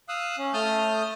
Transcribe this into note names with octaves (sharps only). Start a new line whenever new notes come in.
F5 D#6 E6 F#6
C#4
A3 A5 D#6 F6 G6